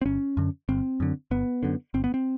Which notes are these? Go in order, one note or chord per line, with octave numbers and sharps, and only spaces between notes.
C4
G1 C#4
F#2 D3
G1 C4
F#2 D3
G1 B3
F#2 D3
G1 C4
B3
C4